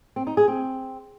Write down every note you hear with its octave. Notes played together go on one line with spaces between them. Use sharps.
C4
D#4
G#4
C4